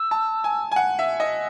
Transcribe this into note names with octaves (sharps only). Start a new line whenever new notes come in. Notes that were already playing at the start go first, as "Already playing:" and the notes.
Already playing: E6
A5
G#5
G#5
F#5
E5
D#5